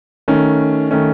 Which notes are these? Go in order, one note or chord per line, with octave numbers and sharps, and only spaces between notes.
D#3 A3 C#4
D#3 A3 C#4